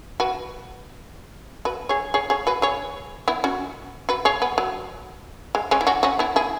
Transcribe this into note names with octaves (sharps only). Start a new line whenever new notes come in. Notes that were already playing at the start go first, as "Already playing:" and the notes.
F#4 B4
F#4 B4
G#4 C#5
G#4 C#5
G#4 C#5
F#4 B4
G#4 C#5
B3 E4
C#4 F#4
F#4 B4
G#4 C#5
B3
F#3
G#3
G#3 C#4
E4
C#4 F#4
C#4 F#4
B3 E4
E4 G#4